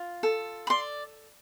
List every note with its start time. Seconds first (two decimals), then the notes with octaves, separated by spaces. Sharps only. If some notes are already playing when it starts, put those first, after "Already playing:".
Already playing: F4
0.23 A4
0.67 B5
0.70 D5 C6